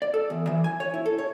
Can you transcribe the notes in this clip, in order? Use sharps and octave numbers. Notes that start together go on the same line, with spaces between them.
D5
A4
E2
E3
G#5
C#5
E4
A4
C#5